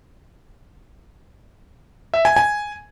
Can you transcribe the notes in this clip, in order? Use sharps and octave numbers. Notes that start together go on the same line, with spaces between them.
E5
G#5
G#5